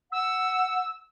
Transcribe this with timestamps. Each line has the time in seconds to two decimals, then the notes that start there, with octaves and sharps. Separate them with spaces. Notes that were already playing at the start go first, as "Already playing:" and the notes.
0.12 F#5 E6